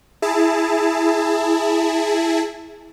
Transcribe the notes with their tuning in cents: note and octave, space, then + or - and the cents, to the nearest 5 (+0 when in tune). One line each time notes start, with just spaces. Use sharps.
E4 +0 G#4 +0 A5 +20